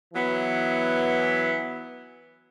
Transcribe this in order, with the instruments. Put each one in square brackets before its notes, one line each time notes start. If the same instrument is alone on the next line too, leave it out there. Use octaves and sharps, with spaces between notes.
[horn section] E3 F#3 B3